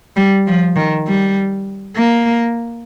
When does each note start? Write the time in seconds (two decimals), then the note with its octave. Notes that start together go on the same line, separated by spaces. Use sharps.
0.17 G3
0.47 F3
0.76 D#3
1.07 G3
1.97 A#3